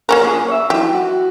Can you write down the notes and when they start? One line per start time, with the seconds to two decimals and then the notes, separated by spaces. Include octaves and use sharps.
0.09 A#3 C#4 A#4
0.22 B1 A#2 G#4
0.48 C#5 E5
0.70 E3 F#3 D#4 G4
0.94 F#4